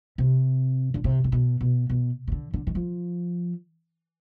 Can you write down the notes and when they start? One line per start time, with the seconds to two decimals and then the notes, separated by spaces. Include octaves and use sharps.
0.18 C3
0.94 D3
1.04 C3
1.24 C3
1.32 B2
1.61 B2
1.90 B2
2.28 C3
2.32 D3
2.53 D3
2.67 D#3
2.75 F3